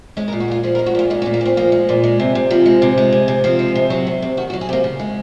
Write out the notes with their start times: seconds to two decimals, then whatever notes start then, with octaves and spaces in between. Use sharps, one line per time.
0.17 G#3 C#4
0.28 A#4
0.33 A#2
0.40 F#4
0.48 A#2 F4
0.63 F3 G#4
0.75 A#4
0.79 G#3
0.86 F#4
0.95 A#2 F4
1.10 G#3 D#4
1.22 C#4
1.26 A#2
1.34 A#3
1.41 A#2 C4
1.57 F3 A#3
1.72 G#3
1.89 A#2
2.04 G#3
2.20 C3
2.35 C3
2.50 F3 C4
2.66 G#3
2.82 C3
2.98 G#3
3.12 C3
3.28 C3
3.44 F3 C4
3.59 G#3
3.75 C3
3.90 F#3
4.07 C3
4.22 C3
4.37 D#3 F#4
4.50 F#4
4.53 F#3
4.61 G#4
4.69 C3 A#3
4.84 C#3
4.99 G#3